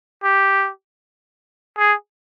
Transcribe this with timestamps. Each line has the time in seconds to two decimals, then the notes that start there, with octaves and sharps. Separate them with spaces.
0.23 G4
1.78 G#4